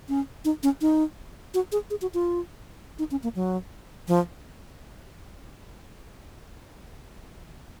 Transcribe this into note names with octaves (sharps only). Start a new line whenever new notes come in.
C#4
D#4
C#4
D#4
F#4
G#4
G#4
F#4
F4
D#4
C#4
A#3
F#3
F3